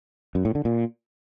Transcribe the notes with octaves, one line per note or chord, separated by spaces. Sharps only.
F#2
A2
D3
A#2